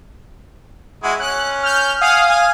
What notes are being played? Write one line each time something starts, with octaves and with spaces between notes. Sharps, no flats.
G#3 E4 F#4
C#4 F#6
F6 G6
F5 F#5 G#5 D#6 F6
G#5